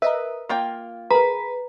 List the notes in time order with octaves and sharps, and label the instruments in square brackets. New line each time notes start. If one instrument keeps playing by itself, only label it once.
[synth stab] A#4 D#5 E5 [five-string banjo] B4
[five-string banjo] A#3 F4 G5
[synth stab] G#4 A#4 [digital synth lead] B4 [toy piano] A#5